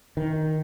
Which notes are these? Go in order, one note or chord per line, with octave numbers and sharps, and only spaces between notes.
D#3